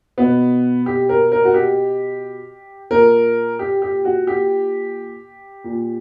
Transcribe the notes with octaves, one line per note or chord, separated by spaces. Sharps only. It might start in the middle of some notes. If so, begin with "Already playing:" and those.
B2 B3
G4
A#4
A#4
F#4
G4
A#2 A#4
G4
G4
F#4
G4
A#2